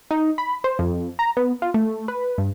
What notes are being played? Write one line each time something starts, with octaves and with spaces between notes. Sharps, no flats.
D#4
B5
C5
F2
A#5
B3
F4
A3
B4
G2